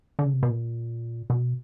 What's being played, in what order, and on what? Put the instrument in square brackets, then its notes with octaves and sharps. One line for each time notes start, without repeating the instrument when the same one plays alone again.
[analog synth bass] D3
C#3
C3
B2
A#2
B2